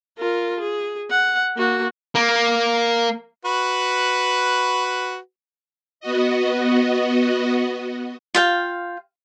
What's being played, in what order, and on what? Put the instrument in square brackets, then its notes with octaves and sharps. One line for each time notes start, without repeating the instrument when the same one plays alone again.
[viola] F4 A#4
G#4
F#5
A#3 F#4
[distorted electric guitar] A#3
[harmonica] F#4 B4
[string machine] B3 F#4 D#5
[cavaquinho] F4 F5 G5